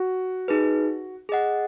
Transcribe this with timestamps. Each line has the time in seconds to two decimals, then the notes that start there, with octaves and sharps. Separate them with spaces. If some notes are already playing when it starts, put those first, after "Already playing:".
Already playing: F#4
0.48 D#4 G#4 B4
1.29 G#4 D#5 F#5